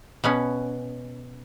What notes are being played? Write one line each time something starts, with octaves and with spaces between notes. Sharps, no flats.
B2 B3 C#4